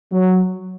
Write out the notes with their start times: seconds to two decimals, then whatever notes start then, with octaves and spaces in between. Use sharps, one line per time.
0.12 F#3